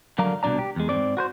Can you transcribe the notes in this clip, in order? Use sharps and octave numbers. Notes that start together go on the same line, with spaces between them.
D3 F#3 A#4 D5 F5 A#5
C2 B2 D#3 D4 D5 A#5
G4
E2 G#3
G#2 C4 D5
F#4 B4 C5